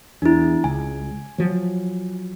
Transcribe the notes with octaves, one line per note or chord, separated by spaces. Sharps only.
E2 D4 E4
C#2 G#5
F3 F#3